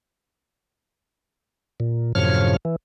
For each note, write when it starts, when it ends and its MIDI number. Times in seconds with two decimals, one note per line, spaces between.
1.80 2.13 46
2.15 2.56 42
2.15 2.56 45
2.15 2.56 48
2.15 2.56 53
2.15 2.56 73
2.15 2.56 89
2.65 2.76 52